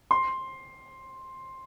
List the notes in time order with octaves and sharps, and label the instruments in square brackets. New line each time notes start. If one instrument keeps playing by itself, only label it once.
[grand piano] C6